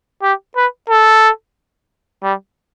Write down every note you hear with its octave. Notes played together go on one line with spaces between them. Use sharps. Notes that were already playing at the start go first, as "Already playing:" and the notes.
G4
B4
A4
G3